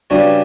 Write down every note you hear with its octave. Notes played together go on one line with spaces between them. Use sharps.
C#3 G3 B3 D4 F#4 C#5